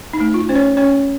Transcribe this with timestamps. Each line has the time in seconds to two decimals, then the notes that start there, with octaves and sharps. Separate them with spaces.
0.13 D#4
0.20 A3
0.34 F4
0.49 C#4 C5
0.55 C#5
0.77 C#4 C#5